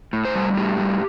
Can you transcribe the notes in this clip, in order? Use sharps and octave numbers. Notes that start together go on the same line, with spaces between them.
A2
C5
G3
A2 G4
G3